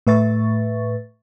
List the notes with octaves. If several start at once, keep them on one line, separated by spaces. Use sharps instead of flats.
A2 A3 B4 E5 C#6 A6